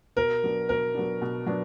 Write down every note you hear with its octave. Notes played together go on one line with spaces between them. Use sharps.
B2 A#4
F#3 B3 D4
B2 A#4
F#3 B3 D4
B2
F#3 B3 D4